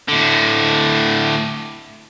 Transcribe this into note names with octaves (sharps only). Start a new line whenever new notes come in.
A2 D3